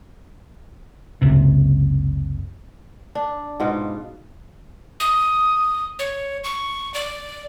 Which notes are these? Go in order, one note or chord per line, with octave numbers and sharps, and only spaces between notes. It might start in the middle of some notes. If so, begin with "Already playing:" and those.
F#1 C#2 C3
D4
G#2 B2 F4
D#6
C#5
C#6
D5